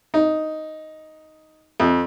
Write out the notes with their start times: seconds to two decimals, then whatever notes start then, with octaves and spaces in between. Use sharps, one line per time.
0.14 D#4
1.80 F2